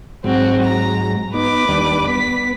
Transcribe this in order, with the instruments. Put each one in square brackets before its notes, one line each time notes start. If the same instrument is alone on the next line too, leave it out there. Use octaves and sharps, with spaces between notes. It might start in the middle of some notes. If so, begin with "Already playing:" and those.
[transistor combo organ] G#2 F#3 [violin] C4 F#4
[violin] A#5
[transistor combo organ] B3 D#4 [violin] B4 D6
[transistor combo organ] D#2 G3 D4
[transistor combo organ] B3 [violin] B6